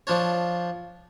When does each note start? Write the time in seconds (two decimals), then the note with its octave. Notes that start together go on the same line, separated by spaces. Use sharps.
0.07 F3 D4 C#5